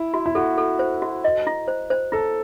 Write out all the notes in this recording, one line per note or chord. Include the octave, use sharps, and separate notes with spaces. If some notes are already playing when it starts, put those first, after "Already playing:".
Already playing: E4
F#4
E4
F#4 A4
A4
C5
F#4
D#5
E4
C5
C5
E4 A4